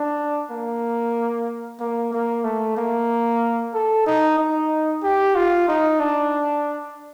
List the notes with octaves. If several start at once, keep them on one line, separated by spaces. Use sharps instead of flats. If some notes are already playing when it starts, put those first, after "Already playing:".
Already playing: D4
A#3
A#3
A#3
A3
A#3
A4
D#4
D#4
G4
F4
D#4
D4